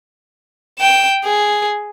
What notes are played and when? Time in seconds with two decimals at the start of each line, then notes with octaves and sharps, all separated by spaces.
0.79 G5 E7
1.25 G#4